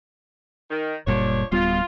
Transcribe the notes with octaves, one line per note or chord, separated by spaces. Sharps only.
D#3
F#1 A#2 F3 G3 D4 C#5
D1 G3 B3 F4